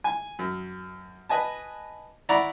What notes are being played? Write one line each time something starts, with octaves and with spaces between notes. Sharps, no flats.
G#5
F#2
B4 D#5 G#5 A5
E4 D5 F#5 A#5 B5 C#6